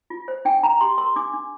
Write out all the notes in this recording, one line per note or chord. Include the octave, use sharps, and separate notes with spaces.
F4
C5
D4 G5
D4 A#5
G4 C6
A#4 C6
D4 D6
D4